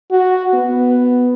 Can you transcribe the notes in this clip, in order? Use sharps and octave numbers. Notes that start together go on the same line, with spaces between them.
F#4
B3